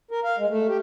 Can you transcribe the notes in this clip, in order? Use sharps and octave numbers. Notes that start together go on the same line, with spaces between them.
A#4
F5
G#3
A3
G4